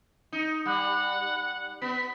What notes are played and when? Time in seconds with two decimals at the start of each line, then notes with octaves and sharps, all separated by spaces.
0.32 D#4
0.66 G3 F#5
1.82 B3 B6